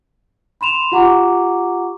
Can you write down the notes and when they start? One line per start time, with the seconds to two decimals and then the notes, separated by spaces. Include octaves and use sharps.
0.61 B5 C6 E7 F7
0.92 F4 G4 F#5 A#5 C#6 D6